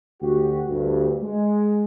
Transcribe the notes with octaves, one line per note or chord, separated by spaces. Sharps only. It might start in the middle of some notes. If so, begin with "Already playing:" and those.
D2 F#4 G4
D2 G2
G#3